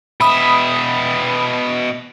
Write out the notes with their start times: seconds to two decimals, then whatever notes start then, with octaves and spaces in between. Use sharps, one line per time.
0.21 B2 E5 B5 D#6